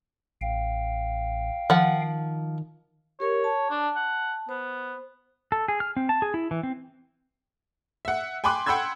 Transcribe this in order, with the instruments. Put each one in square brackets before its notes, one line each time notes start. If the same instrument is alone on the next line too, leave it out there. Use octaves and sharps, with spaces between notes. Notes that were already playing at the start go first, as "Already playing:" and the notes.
[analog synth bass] A1 [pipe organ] F5 G5
[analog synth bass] D#3 [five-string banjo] F3 F#5
[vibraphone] G4 A#4 [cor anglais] C#5
[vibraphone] A5
[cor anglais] D4
F#5
[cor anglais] B3 [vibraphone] C5
[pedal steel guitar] A4
G#4
F6
C4
A5
G#4
E4
E3
C4
[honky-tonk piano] E5 F#5
G5 G#5 B5 C6 D6 F#6
F#5 G5 B5 C6 E6 G#6